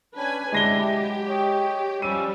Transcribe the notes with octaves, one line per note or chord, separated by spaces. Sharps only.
C#4 D4 B4 G#5
C3 G#3 D4 E4 G4 A#6 G7
F#3
C#5 D#5 G5
F3 G3 C#4 E6 D#7